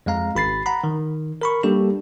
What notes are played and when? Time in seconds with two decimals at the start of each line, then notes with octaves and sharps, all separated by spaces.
0.06 F2 G#3 F5 A#5
0.35 G#1 B5 A6 C7
0.66 F#5 A#5 B5
0.84 D#3
1.42 A#4 B5 C#6
1.63 G3 A#3 D4 G4 A4